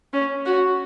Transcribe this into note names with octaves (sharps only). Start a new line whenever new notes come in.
C#4
F#4